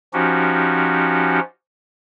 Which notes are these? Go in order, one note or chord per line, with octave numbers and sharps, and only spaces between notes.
F3 C#4 D#4 F#4 G4